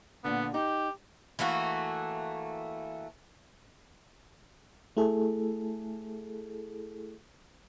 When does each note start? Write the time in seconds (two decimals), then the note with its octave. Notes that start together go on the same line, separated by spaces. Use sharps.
0.24 A#2 D3 B3
0.54 D#4 G4
1.39 E3 A3 A#3 F#4
4.97 A3 E4 G#4 A4